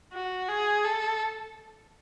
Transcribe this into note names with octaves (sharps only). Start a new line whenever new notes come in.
F#4
G#4
A4